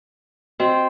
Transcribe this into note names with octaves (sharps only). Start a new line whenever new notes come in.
C4 F#4 D#5